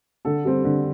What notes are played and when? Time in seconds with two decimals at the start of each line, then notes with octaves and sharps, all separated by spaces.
0.25 D3 A4
0.45 G3 C4
0.64 D3